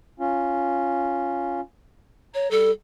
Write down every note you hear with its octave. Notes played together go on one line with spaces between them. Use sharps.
C#4 F4
C#5 A#5
G3 A4